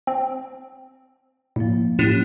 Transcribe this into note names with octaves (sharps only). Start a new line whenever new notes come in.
C4
A2 F3 A#3
A2 F#3 C#4 G4 D#7 E7